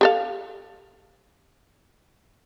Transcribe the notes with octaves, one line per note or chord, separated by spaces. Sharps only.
G4 A4 F5